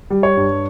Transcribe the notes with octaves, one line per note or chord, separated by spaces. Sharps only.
G3
C#5
G2